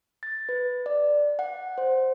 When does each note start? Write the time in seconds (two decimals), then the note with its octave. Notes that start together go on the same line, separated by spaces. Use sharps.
0.23 A6
0.49 B4
0.86 D5
1.39 F#5
1.78 C5